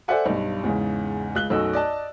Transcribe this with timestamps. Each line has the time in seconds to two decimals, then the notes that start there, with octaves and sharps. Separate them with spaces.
0.08 A4 C5 D5 E5 F#5 G#5
0.26 B1 G2
0.64 E2 G#2 C#3
1.35 C#2 F#6 G7
1.50 B1 F#2 A3 F#4 D#5 E6
1.73 D5 D#5 A5